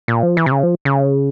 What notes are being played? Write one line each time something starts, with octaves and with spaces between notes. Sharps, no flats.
A#2
F3
E3
C3
C#3
F3
C#3